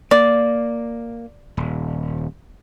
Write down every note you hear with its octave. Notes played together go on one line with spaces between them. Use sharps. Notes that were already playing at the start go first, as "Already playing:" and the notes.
A#3 D5
D#1